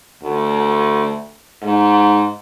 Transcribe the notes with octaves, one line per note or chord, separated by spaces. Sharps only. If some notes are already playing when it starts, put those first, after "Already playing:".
D2
G#2